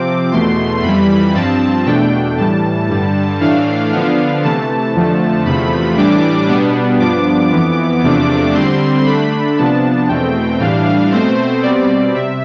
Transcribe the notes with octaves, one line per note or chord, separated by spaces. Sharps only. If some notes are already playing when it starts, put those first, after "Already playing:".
Already playing: C3 F3 C4 D6
E2 B2 A3 C6
F2 E3 G3 B5
G2 F3 C4 A5
E2 B2 A3 D4 G5
A2 E3 G3 A5
G2 D3 G3 A5
A2 E3 A3 D4 F5
D3 F3 B3 D4
C3 E3 A3 A5
F2 D3 F3 A3
E2 C3 F3 A3 B5
A2 E3 G3 D4 D6
B2 G3 B3 D4
G2 F3 B3 D4 D6
F2 E3 B3 D6
E2 C3 F3 A3 D4 D6
D3 G3 C4 C6
D3 A3 D4 B5
C3 F3 B3 D4 A5
E2 B2 A3 C4 G5
A2 E3 G3 D4 F5
B2 A3 C4 C5
B2 G3 C4 D5
C3 E5